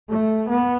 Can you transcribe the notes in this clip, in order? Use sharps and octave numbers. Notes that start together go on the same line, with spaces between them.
A3
B3